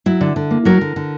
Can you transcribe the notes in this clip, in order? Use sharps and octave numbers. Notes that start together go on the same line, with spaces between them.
F#3 E4
D3
D3
A#3
F#3 A#4
D3
D3